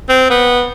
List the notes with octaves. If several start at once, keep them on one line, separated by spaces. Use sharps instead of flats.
C4
B3